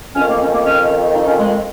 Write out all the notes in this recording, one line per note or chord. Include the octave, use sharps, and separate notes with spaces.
F2 D#3 C#4
A#3
C#4
A#3
C#4
D#4
C#4
G#3
G#3